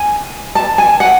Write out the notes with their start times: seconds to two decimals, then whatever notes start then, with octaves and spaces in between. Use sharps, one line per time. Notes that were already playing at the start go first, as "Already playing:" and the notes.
Already playing: G#5
0.55 A5
0.78 G#5
1.00 F#5